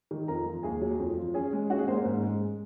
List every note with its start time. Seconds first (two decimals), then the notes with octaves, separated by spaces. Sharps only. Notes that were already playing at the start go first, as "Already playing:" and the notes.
0.11 D#3
0.28 F2 A#4 A#5
0.46 F3
0.63 D#2 G#4 G#5
0.81 F#3
1.00 F2
1.17 F3
1.34 C#4 G#4 G#5
1.53 G#3
1.70 C#4 F#4 F#5
1.79 G#3 G#4
1.88 A#3 C4 C5
1.97 C#4 C#5
2.05 G#2
2.23 G#3